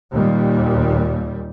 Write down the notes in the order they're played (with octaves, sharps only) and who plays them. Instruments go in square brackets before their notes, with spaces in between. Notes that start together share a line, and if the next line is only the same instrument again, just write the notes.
[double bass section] D#2 A#2 G3